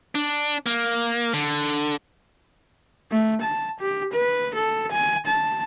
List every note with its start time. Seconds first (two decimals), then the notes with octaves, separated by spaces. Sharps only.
0.15 D4
0.66 A#3
1.34 D3
3.12 A3
3.42 A5
3.80 G4
4.13 B4
4.55 A4
4.92 G#5
5.26 A5